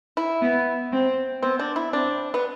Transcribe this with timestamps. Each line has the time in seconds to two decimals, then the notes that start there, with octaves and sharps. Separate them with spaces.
0.17 E4
0.42 B3
0.92 C4
1.43 B3 C4
1.59 D4
1.76 E4
1.93 C4 D4
2.34 B3